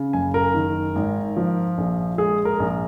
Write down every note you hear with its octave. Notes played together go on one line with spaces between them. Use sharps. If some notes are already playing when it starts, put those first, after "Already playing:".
Already playing: C#3
F#1 G#5
A#4
D#3
G#1
F3
A#1
G#3 G#4
A#4
A#1